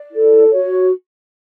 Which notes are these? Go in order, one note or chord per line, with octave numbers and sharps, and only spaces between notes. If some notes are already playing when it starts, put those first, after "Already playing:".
Already playing: D5
E4 A4
F#4 C#5